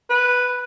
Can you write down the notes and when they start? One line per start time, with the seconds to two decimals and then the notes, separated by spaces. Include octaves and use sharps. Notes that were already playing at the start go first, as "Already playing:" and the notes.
0.10 B4